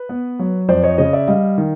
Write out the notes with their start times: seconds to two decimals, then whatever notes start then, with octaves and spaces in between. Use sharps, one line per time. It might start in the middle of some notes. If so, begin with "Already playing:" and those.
Already playing: B4
0.09 B3
0.39 F#3
0.69 F2 C5 D5
0.84 C#5 D#5
0.98 C#3 C#5 D#5
1.13 D5 E5
1.28 G3 D#5 F5
1.58 D#3